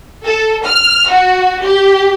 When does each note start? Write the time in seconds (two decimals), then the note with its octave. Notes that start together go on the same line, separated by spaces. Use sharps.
0.24 A4
0.64 F6
1.09 F#4
1.62 G4